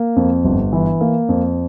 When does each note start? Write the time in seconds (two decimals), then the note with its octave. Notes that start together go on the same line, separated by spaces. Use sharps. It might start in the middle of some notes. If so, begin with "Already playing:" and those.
Already playing: A#3
0.16 F2
0.45 G1
0.73 E3
1.01 A#3
1.29 F2